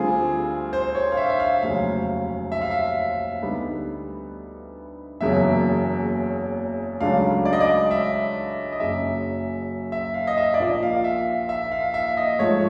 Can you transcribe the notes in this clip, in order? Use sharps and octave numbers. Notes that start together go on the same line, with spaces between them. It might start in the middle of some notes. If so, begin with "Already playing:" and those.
Already playing: D2 D3 G3 C4 F4 G#4
C5
C#5
F5
E5
E5
F5
F1 D#2 C#3 F#3 F5
E5
F5
E5
D2 D3 G3 B3 D#4
F#1 E2 C#3 F#3 A#3 E5
C#2 C#3 F#3 A3 D4 F5
D5
D#5
D5
E5
D#5
F#1 F#2 C#3 F#3 E5
E5
F5
D#5
E5
D5
A#1 A#2 F3 A#3 D#5
F5
E5
E5
F5
E5
D#5
G#2 F3 A3 C#5